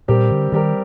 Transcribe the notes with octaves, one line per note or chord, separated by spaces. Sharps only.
A#2 G3 C4 G4 A#4
D3
D#3 G3 C4 G4 A#4